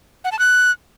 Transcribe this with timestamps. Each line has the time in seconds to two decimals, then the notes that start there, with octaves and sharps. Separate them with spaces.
0.24 F#5
0.32 A5
0.39 F#6